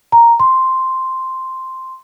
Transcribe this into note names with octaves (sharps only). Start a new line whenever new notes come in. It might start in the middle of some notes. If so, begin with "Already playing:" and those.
A#5
C6